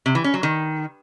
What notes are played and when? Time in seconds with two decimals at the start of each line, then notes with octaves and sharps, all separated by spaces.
0.06 C3
0.15 E3
0.24 C#4
0.34 F#3
0.43 D#3